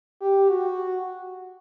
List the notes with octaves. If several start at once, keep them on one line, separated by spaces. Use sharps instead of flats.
G4
F#4